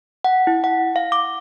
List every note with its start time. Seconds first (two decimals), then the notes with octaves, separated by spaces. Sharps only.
0.24 F#5
0.47 E4
0.64 F#5
0.96 F5
1.12 D6